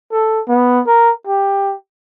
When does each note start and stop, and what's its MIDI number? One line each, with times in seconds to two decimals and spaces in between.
0.12 0.41 69
0.48 0.81 59
0.87 1.12 70
1.27 1.75 67